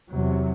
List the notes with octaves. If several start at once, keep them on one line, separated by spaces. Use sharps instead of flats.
E2 C3 F#3